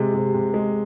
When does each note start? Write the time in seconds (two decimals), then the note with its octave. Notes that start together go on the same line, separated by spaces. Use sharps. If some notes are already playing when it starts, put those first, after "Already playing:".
Already playing: C3 G#3
0.14 C3
0.34 C3
0.54 G#3